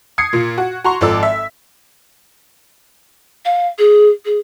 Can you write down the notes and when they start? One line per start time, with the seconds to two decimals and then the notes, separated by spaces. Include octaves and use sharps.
0.18 D#6 G#6 C7 C#7
0.33 A#2
0.58 F#4
0.84 F#4 A#5 C6 C#6
1.01 G#1 F3 A4 D5 E6
1.23 E5
3.45 F5
3.78 G#4
4.25 G#4